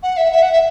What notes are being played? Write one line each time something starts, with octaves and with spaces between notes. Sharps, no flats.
F#5
E5
E5
F#5
E5